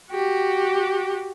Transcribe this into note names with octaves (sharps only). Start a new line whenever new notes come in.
F#4 G4